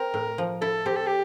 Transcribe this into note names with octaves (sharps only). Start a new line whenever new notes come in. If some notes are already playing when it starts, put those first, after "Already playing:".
Already playing: C4 A#4
A2
F3
E4 A4
C4 G4
A4
G4